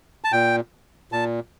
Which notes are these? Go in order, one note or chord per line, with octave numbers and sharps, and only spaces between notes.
A5
A#2 G5
A#2 A5